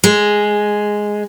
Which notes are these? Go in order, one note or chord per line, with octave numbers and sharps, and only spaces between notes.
G#3